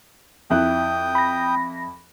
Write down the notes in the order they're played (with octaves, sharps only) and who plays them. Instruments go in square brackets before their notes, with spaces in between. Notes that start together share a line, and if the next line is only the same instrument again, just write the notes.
[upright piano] F2 E4 F#6 [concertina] G5 D#6
[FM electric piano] B5 A#6